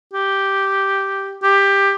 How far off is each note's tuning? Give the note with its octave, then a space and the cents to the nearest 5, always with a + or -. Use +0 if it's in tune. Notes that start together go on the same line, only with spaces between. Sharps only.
G4 -5
G4 +15